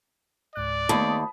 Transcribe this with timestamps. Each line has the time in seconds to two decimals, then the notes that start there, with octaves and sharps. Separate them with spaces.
0.56 C#2 G#2 D5 F#6
0.89 D#2 A3 B3 A5 B5 D#6